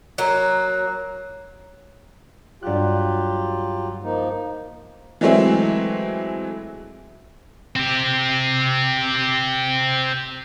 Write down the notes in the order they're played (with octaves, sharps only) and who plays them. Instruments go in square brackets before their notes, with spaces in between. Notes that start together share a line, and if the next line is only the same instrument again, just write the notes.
[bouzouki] F#3 A#3
[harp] G2 F#6 [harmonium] F#3 F4 G4
[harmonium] F3 A#3 D#4
[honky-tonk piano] E3 F#3 G#3 A3 C4 E4
[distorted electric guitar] C4 G4